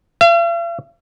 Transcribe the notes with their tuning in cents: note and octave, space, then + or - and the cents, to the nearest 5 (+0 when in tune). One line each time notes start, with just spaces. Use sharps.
F5 -45